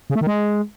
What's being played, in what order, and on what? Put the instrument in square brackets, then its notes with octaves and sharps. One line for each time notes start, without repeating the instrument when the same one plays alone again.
[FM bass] C#3
A3
D#3
G#3